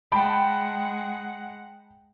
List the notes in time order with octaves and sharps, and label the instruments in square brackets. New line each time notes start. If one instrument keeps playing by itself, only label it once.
[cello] G#3 F#5 [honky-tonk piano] G5 A5 B5